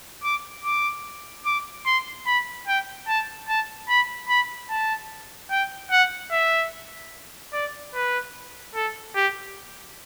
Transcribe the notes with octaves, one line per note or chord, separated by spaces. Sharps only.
D6
D6
D6
C6
B5
G5
A5
A5
B5
B5
A5
G5
F#5
E5
D5
B4
A4
G4